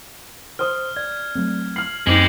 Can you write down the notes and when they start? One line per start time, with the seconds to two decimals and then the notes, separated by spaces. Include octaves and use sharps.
0.59 C5 C6 D#6 F6
0.96 D5 G#6
1.35 F#3 A3 C4
1.76 F6 C7 F#7
2.07 F#2 G#3 C4 D#4 G4 C7 F#7